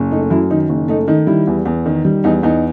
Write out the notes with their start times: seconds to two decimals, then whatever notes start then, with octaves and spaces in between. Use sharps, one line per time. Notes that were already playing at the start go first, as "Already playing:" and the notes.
Already playing: F#1
0.11 A3 D#4
0.30 F#2 E4
0.50 D#3 D#4
0.69 F#1
0.88 A3 D#4
1.08 D#3 D#4
1.27 G3 E4
1.47 E2
1.65 E2
1.86 D#3
2.05 G3
2.24 E2 D#4
2.43 E2 D#4